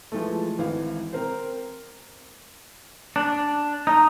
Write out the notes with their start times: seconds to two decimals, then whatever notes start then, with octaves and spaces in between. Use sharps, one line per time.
0.12 E3 F3 G#3 A3
0.58 G#1 E3 F5
1.13 C4 A#4 C5
3.16 D4
3.87 D#4